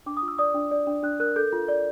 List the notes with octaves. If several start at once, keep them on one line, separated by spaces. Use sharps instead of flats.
D4 D6
D#6
F4
E6
D5 D#6
D4
D5
D4
D4 F#6
A#4 F#6
A4 G6
F4
D5